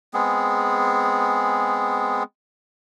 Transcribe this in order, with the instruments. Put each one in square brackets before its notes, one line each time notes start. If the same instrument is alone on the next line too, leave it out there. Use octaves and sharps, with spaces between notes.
[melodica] G#3 B3 C4 G#4